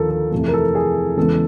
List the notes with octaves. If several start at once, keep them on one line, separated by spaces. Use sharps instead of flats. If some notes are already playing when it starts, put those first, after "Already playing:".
Already playing: D#2 D3 F3 A4 A#4
A4
F2 C3 E3 A3 A4
A#4
A4
G#4
E2 C#3 E3 G#3 B3 A4